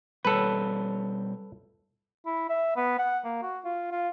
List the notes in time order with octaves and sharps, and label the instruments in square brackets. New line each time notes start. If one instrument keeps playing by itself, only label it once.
[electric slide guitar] B2 G3 C#5 [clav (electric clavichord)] A4 B4
[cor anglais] E4
E5
B3
F#5
A#3
F#4
F4
F4